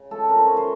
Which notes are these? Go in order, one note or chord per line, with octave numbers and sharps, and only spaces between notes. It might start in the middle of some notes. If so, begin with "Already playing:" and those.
Already playing: C#3
A3 A4
C#4 A#4
C5
C#4 C#5
C5